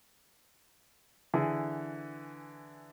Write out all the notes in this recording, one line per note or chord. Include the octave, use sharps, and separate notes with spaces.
D3 E3 G#4